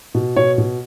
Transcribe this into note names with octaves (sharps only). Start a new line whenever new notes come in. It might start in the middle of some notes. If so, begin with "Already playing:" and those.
B2
B2 C#5
B2